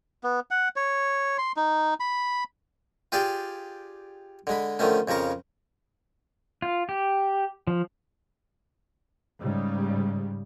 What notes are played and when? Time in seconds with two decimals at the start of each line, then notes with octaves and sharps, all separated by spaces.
0.24 B3
0.51 F#5
0.76 C#5
1.38 C6
1.57 D#4
2.00 B5
3.12 F4 G4 G#4 D5 F5 G5
4.47 D3 G#3 B5
4.79 D3 D#3 F3 A3 C#4
5.08 F2 C#3 F3 A#4 C#6
6.62 F4
6.89 G4
7.67 F3
9.38 G#2 C#3 G3